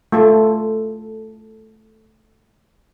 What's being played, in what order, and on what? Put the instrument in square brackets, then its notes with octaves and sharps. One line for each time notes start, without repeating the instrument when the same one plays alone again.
[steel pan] A3 F4 A4